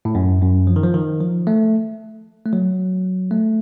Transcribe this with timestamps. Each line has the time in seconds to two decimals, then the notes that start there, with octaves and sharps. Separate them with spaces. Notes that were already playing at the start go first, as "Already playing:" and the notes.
0.05 A2
0.15 F#2
0.42 F#2
0.67 F3
0.76 D#3
0.83 F3
0.94 D#3
1.20 F3
1.47 A3
2.46 A3
2.53 F#3
3.31 A3